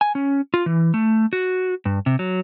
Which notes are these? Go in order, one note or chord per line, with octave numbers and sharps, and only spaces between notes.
G#5
C#4
F4
E3
A3
F#4
G2
C3
F#3